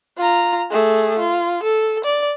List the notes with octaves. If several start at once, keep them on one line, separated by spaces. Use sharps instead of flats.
F4 A#5
A3 G#4
F4
A4
D5